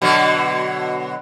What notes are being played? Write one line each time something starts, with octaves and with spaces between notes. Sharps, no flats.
B2 D3 F#3